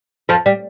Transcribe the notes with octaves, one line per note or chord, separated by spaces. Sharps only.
F2 F3
G3